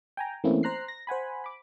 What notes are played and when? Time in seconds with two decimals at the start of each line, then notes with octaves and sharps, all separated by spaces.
0.17 G5 G#5 A#5
0.44 E3 A3 A#3 C4 C#4 E4
0.63 C5 A#5 F#6 C7
0.88 A#6
1.07 C5 F#5 G#5 B5
1.44 B5 D6